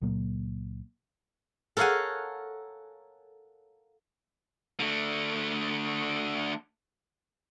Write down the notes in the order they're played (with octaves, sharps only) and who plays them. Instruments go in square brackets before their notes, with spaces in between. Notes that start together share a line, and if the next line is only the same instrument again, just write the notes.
[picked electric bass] C#2 A#2 F#3 A#3
[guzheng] A4 A#4 C#5 F5 F#5 G#5
[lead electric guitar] D3 A3